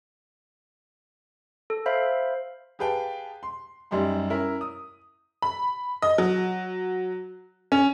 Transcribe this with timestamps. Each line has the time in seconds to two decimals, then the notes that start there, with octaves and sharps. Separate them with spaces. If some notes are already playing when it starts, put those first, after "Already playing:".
1.70 A4
1.86 C5 E5 F5 B5
2.79 G4 G#4 B4 F5 G5 A5
3.43 C6
3.91 F#2 G3 D#4 G4 C6
4.30 C#4 E4 A#4 E5
4.61 D#6
5.42 B5
6.02 D#5
6.18 F#3
7.72 C#4